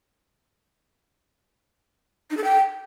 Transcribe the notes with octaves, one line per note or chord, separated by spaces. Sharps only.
D#4
A4
G5